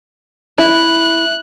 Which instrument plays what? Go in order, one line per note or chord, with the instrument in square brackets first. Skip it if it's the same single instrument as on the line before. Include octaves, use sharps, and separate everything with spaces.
[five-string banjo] E4 [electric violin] F#6